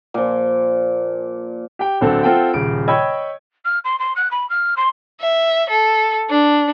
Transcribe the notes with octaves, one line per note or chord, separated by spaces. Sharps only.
A#2 F3
G4 G5
D1 D3 C4 A4
C4 F4 A4 F#5 G5
D#1 C#3 D7
C#5 D#5 G5 B5 E6 G#6
F6
C6
C6
F#6
B5
F6
C6
E5
A4
D4